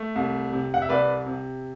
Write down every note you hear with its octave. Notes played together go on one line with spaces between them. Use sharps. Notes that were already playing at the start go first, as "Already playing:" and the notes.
Already playing: A3
C2
C3
F#5
E5
C2 B4 D5
C3